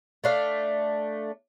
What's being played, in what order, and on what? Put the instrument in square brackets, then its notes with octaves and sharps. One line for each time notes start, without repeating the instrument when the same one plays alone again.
[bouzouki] A3 D4 F5